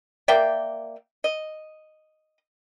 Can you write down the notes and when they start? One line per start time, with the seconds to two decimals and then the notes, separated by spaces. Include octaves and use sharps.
0.28 A#3 D5 E5 G5
1.24 D#5